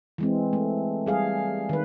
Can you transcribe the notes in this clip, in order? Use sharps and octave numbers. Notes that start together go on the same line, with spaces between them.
E3 G#3 C4
A3
G3 G#4 F5
D#3 B4